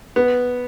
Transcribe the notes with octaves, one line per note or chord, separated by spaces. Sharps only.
B3